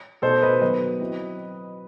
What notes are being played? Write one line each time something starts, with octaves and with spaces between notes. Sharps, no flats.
B2 A3 D#4 A4 C5
B4 D#5
D#3 F#3 B3 B4 D#5
F#3 C4 E4